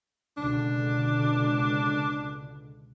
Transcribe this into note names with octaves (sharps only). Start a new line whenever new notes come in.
C#2 B2 D3 D4